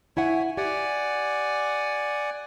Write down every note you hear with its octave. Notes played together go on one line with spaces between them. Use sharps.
E4 C#5 E5 F#5 G#5
G4 D5 F#5 G#5